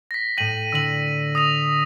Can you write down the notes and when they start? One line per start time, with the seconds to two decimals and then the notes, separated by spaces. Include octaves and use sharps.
0.11 A#6 B6
0.37 A2 G5 A#6 D#7 F#7
0.72 D3 E6 F#7
1.35 D#6 A#6 F7